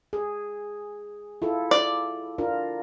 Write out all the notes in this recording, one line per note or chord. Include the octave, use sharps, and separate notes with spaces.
G#4
E4 F4 A4
D5
D4 F4 A#4